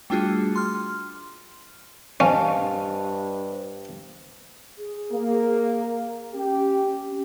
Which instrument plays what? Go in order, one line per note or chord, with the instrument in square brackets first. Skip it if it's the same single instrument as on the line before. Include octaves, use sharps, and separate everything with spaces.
[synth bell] G3 A3 D4 F4 F#4 G#4
C6 F6
[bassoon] G2 [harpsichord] C#4 [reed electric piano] C5 D#5 A5 [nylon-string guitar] F5
[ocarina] G#4
[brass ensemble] A#3
[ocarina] C#4 [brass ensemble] G4